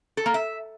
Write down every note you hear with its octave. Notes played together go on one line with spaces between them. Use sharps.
A4
A#3
E5